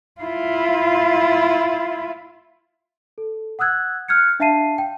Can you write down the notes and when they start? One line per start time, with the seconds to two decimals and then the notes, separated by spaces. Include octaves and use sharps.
0.21 E4 F4
3.18 A4
3.59 F#5 D#6 E6 F#6 G#6
4.08 F6 F#6 G#6 C#7
4.40 D4 E5 F5 A5 C7 D#7
4.78 G5